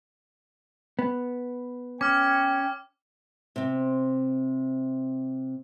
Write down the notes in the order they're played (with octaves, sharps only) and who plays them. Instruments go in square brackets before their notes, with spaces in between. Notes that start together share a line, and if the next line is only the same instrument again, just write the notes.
[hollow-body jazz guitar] B3
[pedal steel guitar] C#4 [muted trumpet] G5 [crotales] D6 F6
[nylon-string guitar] C3 C4